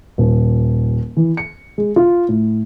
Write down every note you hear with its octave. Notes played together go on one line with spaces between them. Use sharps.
D#1
E3
C#7
G#3
F4
A2